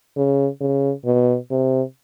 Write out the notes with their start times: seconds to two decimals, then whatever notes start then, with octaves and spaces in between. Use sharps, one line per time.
0.17 C#3
0.61 C#3
1.05 B2
1.51 C3